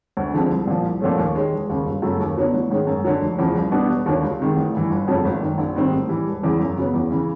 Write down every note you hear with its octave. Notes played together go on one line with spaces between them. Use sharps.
D2
D3 F3 G#3 C4
C2
A#2 F3
C2
A#2 F3 A3 C#4
D#2
D#3 G#3 C#4
E1
D#2 C#3
G1
F#2 C#3 F#3 A3
D#2
D3 F#3 B3
A1
G#2 D#3 G#3 C#4
F#2
D3 F#3
F1
E2 C#3 F3
C2
B2 G3 B3 D4
E1
D#2 D3 F#3
C#2
C3 D#3 G#3
A1
G2 E3
G1
F2 C#3 F#3 A3
G#1
F#2 D#3
A#1
G#2 D#3 G3 C4
A2
E3 G3
E1
E2 C#3 E3
F#2
C#3 F#3 B3
E2
C#3 E3